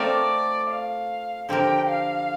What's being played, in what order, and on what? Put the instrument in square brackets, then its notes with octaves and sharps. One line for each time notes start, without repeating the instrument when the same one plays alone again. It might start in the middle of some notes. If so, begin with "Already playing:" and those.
Already playing: [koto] A3 C4 F4 A#4 [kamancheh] D5
[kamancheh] F5
[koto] D3 F3 C4 G4 A#4 [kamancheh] G5
[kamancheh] F5